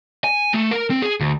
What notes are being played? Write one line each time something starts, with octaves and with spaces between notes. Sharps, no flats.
G#5
A3
A#4
C4
G#4
D2